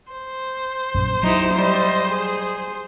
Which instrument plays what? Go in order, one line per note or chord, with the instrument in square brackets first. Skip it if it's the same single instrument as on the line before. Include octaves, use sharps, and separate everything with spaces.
[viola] C5
[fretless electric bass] A#1 F#2
[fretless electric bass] F#3 [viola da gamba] D#4 E4 G4
[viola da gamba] G3 D#5
G#4